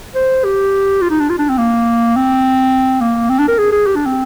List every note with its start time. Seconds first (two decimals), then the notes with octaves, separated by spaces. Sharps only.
0.15 C5
0.45 G4
1.02 F4
1.11 D#4
1.20 D4
1.30 F4
1.39 D4
1.49 C4
1.58 A#3
2.16 C4
3.01 A#3
3.30 C4
3.39 D4
3.48 A#4
3.58 G#4
3.72 G#4
3.87 G4
3.96 D4
4.06 C4